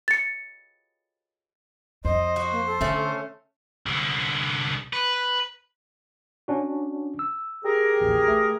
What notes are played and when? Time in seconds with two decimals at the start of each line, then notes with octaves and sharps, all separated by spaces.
0.08 A6 C#7
2.05 F2 C5 D#5
2.36 F#4
2.51 A#3
2.66 A4
2.81 D3 A3 C#4
3.86 C2 D3
4.93 B4
6.48 C#4 D4 F#4
7.19 E6
7.65 G4 G#4 A#4
8.01 A1 D#2
8.28 A3